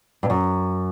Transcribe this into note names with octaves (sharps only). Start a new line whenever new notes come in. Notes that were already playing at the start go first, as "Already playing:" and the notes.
G2
F#2